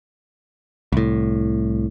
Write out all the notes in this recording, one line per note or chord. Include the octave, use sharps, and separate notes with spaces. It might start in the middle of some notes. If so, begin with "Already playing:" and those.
C2 A2